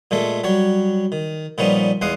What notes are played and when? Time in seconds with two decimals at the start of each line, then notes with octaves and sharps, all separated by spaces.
0.11 A#2 G#3 A3 A4
0.44 F#3 G3 C#5
1.12 D#3
1.58 A#2 F3 G3 B3 C#4 D#4
2.01 E2 G#3 F5 F#5 D#6